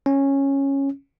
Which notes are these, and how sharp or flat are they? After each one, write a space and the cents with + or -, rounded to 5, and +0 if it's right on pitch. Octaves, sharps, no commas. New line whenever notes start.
C#4 -10